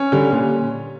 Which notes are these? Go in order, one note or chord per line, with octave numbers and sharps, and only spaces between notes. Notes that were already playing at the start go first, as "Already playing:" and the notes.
Already playing: C#4
D3 G3
A#2